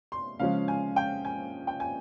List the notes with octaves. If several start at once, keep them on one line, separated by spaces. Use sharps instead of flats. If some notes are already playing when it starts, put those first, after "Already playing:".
C6
C#3 F3 G#3 C#4 F5
G#5
G5
G#5
G5
G#5